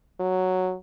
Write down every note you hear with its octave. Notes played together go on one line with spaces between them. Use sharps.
F#3